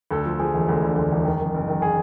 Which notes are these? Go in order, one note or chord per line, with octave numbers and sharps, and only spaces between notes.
D2 A4
F3
F3 G#4
E1
D2
D3
D2
E1
D#3
F#1
F#1
D#3
G#4